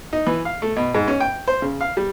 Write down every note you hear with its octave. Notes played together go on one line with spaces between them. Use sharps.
D#4
E3
F5
A3
B2
G#2
C#4
G5
C5
C#3
F5
G3